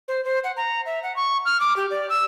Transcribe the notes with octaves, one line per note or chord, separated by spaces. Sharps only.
C5
C5
F#5
A#5
E5
F#5
C#6
F6
D6
G4
D5
E6